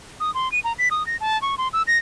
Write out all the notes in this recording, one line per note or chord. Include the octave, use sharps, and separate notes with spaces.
D#6
C6
D#7
A#5
B6
D#6
A#6
A5
C#6
C6
E6
A#6